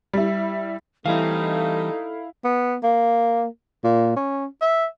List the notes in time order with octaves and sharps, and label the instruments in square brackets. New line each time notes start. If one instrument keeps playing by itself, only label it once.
[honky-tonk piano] G3 E4
[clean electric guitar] E3 G3 C4 [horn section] A3 D#4 [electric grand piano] E4 F5 [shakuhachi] A4
[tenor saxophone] B3
A#3
A#2
C#4
E5